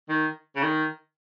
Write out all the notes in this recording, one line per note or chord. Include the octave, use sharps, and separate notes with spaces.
D#3
C#3
D#3